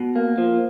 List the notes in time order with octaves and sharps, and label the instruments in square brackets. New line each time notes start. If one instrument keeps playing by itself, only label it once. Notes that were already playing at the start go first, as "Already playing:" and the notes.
Already playing: [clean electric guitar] B2
A#3
F3